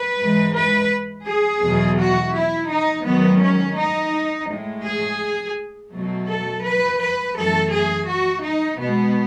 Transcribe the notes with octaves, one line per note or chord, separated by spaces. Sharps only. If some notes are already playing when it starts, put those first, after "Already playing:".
Already playing: B4
G#2 E3 G#3
B4
G#4
E2 B2 F#3 A3
F#4
E4
D#4
G#2 D#3 F#3 A3 B3
C#4
D#4
A2 G#3
G#4
B2 F#3 A3
A4
B4
B4
F#2 E3 A3 A4
G#4
F#4
D#4
B2 G#3 B3